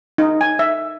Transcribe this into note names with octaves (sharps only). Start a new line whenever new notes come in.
D#4
G#5
E5